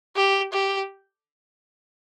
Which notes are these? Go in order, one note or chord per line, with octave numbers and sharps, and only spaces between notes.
G4
G4